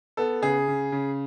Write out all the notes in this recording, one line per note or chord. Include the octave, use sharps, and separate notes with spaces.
B3 A4
C#3 G#4
C#3
C#3